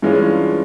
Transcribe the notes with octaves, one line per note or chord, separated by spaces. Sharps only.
G2 E3 G#3 C#4 F4